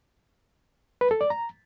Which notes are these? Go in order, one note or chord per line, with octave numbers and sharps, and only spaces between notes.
B4
A4
D5
A#5